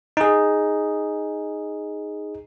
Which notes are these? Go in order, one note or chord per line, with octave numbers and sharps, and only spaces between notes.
D#4 G#4